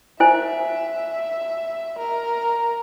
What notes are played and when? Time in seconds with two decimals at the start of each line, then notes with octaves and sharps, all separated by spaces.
0.20 E4 C5 E5 G#5
1.99 A#4